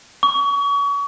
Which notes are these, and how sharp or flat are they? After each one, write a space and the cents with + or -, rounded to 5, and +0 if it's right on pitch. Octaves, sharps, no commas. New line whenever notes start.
C#6 +35